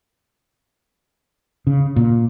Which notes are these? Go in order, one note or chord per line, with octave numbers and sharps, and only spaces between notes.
C#3
A#2